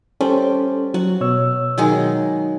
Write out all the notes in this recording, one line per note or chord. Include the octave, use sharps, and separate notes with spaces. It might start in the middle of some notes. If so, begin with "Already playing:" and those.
G3 C#4 A4 C5
F#3 F#4
B2 C#5 E6
D#3 F#3 G#3